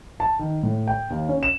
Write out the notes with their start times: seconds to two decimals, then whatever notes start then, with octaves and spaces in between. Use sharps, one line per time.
0.20 A5
0.39 D#3
0.63 A2
0.88 G5
1.10 D#2
1.29 C#4
1.43 E7